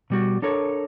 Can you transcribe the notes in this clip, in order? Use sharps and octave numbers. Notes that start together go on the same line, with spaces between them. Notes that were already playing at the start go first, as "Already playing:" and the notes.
B2 G3 F#4
D4 A4 A#4 C#5